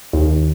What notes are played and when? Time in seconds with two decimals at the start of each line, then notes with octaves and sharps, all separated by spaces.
0.13 D#2